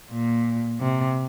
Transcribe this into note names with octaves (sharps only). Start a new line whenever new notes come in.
A#2
C3